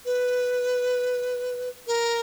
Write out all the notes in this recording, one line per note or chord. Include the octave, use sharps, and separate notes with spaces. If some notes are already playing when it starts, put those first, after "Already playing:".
B4
A#4